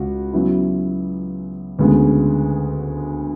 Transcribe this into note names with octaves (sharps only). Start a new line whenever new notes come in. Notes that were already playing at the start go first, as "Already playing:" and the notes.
Already playing: C#2 F#4
C#3 F#3 B3 E4
D2 C#3 G#3 B3